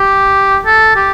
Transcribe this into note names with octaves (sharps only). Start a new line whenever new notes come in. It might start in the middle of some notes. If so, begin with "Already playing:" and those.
Already playing: G4
A4
G4